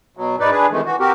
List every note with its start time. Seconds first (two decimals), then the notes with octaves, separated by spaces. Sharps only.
0.17 B2 F#3
0.40 G#2 D#4 B4 D5
0.52 D4 G#4 B4
0.71 C3 D#3 E3 G#3 A3
0.86 E3 F#4
1.00 C4 F#4 G4 A#4